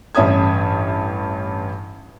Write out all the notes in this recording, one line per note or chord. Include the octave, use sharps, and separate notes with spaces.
A1 G2 C#4 E5 D#6 G#6